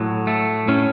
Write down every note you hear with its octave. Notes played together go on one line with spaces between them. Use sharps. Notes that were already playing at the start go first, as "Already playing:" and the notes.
Already playing: A2 F#3
A3
A2 C#4